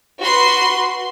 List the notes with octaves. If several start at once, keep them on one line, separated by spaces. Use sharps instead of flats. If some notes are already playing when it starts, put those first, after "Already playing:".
F#4 B4 C6 C7